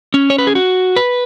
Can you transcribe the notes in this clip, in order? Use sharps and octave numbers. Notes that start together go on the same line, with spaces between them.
C#4
C#5
B4
G#4
F#4
B4